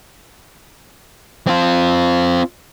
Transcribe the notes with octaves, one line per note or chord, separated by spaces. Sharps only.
C4 F4